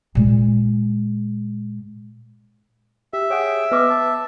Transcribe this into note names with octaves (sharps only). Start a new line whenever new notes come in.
A#2 G#3
G4 E5
G#4 C#5 F#5 G5
B3 B4 D#5 D6
A5